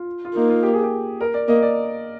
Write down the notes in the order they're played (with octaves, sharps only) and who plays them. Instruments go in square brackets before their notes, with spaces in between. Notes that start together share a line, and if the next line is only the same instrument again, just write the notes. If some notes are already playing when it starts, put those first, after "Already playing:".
Already playing: [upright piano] F4
F4
[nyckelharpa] A#3 [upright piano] D#4
[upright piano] F4
G4
G#4
G4
A#4
D5
[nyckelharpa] A#3 [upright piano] D#5
[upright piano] D5